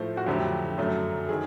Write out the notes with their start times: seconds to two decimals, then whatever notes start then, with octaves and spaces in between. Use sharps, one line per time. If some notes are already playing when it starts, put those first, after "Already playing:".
Already playing: A2 F3 A3 C5
0.17 F#4
0.27 F2 D3 F#3 A3 G4
0.78 F#2 D3 F#3 A3
1.29 D#3 G#4